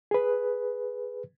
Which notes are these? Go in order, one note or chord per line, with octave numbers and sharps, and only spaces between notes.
G#4 B4